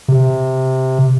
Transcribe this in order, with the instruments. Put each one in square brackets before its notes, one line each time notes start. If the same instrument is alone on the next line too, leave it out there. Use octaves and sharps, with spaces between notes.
[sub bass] C3